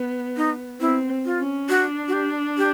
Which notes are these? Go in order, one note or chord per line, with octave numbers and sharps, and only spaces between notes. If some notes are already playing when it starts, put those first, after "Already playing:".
Already playing: B3
D#4
C4 E4
F4
C#4
D4 F#4
F#4
G4
G4